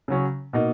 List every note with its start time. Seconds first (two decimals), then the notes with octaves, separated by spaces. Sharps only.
0.08 C#3 F#3 C#4
0.53 B2 A#3 D#4